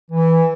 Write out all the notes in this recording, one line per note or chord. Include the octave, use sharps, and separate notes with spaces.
E3